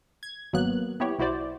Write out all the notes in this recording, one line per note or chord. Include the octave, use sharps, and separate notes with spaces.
G#6
G#1 F#3 A#3 B3 F#6
B3 E4 G4 C#5
B1 E4 F#4 C5 D5